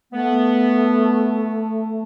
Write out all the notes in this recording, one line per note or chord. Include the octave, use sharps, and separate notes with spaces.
A3 B3